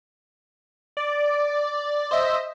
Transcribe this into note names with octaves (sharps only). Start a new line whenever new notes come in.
D5
C5 D#5 E5